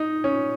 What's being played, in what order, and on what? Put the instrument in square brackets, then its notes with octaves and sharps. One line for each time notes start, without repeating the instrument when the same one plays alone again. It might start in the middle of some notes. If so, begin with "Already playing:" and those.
Already playing: [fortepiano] D#4
C#4